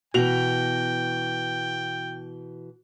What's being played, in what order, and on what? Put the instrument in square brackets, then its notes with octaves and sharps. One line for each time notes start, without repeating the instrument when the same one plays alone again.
[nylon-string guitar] B2 E3 [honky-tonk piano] F#4 F7 [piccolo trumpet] G5